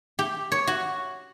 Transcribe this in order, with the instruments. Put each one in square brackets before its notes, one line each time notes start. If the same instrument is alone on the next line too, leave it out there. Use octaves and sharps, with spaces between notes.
[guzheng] G4
C#5
F#4